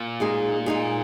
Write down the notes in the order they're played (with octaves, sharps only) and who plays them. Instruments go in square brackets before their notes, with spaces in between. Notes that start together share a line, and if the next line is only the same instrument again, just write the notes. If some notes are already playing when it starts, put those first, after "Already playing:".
Already playing: [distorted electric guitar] A#2
[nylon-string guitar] G#3 D#4 G#4
G#3 D#4 G#4